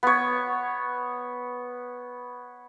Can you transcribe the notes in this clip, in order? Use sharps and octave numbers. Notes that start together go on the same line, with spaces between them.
B3 C#5